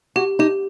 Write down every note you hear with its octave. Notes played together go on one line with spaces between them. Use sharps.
F#4 G4
D#4 G4